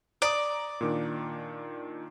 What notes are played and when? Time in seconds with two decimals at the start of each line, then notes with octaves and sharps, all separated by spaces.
0.22 D5 A#5 D#6
0.81 A#2 D#3 D4